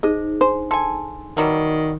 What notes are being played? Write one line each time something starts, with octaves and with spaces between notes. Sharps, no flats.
D#4 G#4 C5 D#5
D4 C5
A4 G#5 C6
B2 D#3 F#3 G3